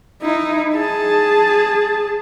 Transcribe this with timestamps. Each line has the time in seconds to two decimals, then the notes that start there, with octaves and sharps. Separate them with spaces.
0.22 D#4 E4
0.75 G#4 A5